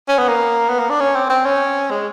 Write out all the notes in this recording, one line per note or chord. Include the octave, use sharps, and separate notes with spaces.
C#4
B3
A#3
B3
A#3
D4
C#4
C4
C4
C#4
G#3